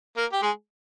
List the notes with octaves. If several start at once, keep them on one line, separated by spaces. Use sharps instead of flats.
A#3 A#4
G4
G#3 G#4